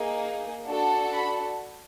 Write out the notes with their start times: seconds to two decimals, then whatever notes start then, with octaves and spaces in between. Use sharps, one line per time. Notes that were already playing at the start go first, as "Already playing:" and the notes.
Already playing: A#3 D#4 G#4
0.67 D4 F#4 A4
1.12 B5